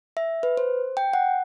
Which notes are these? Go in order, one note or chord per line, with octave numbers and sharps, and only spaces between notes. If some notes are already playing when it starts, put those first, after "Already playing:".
E5
B4
C5
G5
F#5